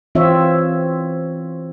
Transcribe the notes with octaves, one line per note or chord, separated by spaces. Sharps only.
E3 C4 F4 C#5 E5